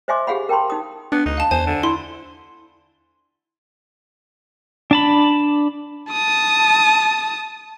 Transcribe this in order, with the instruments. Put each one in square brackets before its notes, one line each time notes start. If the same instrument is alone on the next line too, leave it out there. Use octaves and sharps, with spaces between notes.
[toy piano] C5 D#5 E5 G#5 C6 D6
G4 G#4 F5 F#5 B5
A#4 G5 A5 B5 C6
D#4 D#6
[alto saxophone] B3 [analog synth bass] D4
[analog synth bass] D2 [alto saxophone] D#4
[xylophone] F5 A5
[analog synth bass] E2 [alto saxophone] C5 [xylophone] G#5
[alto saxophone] D3
[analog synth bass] E4 [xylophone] C6
[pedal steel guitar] D4 A5 B5
[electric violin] A5 D#6